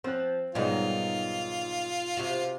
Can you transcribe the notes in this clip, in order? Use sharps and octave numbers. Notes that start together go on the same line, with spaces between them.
F3 C4 F#6
B1 G#2 D#3 G3 F4
C3 F#4